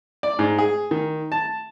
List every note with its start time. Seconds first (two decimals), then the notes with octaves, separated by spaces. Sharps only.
0.23 D5
0.39 G#2
0.58 G#4
0.91 D#3
1.32 A5